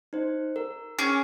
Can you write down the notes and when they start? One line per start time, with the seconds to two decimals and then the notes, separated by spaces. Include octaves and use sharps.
0.13 D#4 C5
0.56 A#4
0.99 C#4 G#4 D6 F6